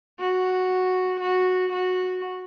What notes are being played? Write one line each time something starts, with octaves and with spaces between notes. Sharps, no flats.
F#4
F#4
F#4